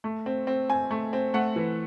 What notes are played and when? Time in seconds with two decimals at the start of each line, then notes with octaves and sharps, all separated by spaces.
0.04 A3
0.26 C4
0.47 C4
0.70 C4 G#5
0.91 A3
1.13 C4
1.34 A3 F#5
1.56 E3